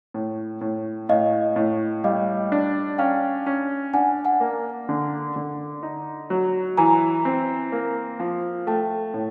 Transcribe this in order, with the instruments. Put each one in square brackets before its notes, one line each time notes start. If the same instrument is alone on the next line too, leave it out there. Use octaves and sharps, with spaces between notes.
[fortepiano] A2
A2
[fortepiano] A2 [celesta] D#5 F5
[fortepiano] A2
[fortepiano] G3 [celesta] D#5 F5
[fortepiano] D4
[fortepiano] C#4 [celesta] F5 G5
[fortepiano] C#4
[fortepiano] D4 [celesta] F#5 G#5
[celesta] F#5 G#5
[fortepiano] A#3
D3
D3
D#4
F#3
[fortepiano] E3 [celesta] G#5 A#5
[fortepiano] C4
A#3
F3
[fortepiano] A3 [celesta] G5 A5
[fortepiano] A2